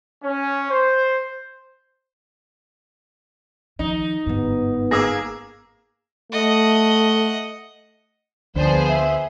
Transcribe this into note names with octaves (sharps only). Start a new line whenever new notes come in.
C#4
C5
D#3 F3 D#4
G1 G#2 B3
A#3 G#4 D6 E6 A#6
A3 D#5 F#5
D2 F3 B3 G#4 C5 D5
E5